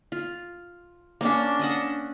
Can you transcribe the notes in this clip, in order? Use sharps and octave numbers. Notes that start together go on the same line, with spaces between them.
F4
A#3 C#4 D4
C#4 D#5 F#5